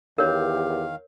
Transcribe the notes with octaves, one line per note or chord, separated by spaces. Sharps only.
E2 D#3 G4 A#4 C#5 F5